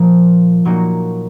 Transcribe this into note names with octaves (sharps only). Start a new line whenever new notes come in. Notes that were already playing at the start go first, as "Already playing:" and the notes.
Already playing: A#2 F3 A#3
A#2 F#3 A#3 D#4